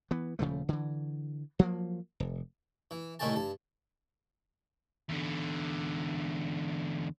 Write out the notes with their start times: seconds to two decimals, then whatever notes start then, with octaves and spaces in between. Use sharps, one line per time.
0.11 E3 B3
0.39 D#1 C#3 F3 A3
0.69 D3 E3
1.59 F3 F#3 A#3
2.20 F1
2.91 E3
3.19 C2 A2 D#3 A3 G#5 A5
3.36 G2 A5
5.09 E2 D3